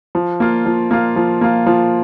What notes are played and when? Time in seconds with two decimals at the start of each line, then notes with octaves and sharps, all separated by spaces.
0.15 F3
0.40 A#3 F4
0.66 F3
0.91 A#3 F4
1.16 F3
1.41 A#3 F4
1.67 F3